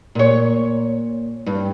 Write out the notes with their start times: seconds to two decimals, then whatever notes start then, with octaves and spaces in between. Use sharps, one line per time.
0.15 A#2 C#5
1.46 G2